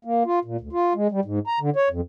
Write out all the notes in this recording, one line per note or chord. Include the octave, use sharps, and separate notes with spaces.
A#3
F4
A#2
D2
F4
G#3
G3
G#2
A#5
D3
C#5
F2